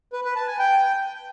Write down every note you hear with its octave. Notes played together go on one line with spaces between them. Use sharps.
B4
B4
A5
G#5
G5